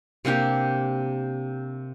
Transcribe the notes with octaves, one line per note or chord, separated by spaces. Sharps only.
C3 A#3 D4 G4